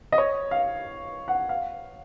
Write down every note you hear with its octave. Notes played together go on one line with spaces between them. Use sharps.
D#5
C#5
F5
F#5
F5